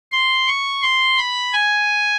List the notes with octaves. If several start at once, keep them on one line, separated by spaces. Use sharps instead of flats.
C6
C#6
C6
B5
G#5